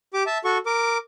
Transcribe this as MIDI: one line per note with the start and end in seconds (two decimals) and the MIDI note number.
0.14 0.23 67
0.14 0.23 86
0.26 0.38 76
0.26 0.38 81
0.44 0.58 66
0.44 0.58 69
0.44 0.58 85
0.66 0.98 70
0.66 0.98 86